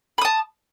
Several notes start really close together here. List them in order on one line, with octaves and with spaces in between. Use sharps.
B5 D#6 A5